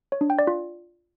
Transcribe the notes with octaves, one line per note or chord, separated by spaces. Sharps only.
C#5
D4
G5
D5
F4